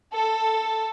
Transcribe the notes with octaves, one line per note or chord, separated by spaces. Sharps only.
A4